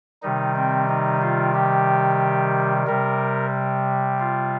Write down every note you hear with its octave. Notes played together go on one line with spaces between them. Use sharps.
C3 D#3 G3 D#4
C4
D#4
F4
G4
C3 G3 A#4
F4